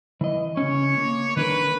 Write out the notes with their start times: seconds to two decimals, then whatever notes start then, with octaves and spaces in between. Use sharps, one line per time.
0.21 E3 D#5
0.57 C#3 C#4 C#5
0.97 A#3
1.37 D#3 D4 A#4 B4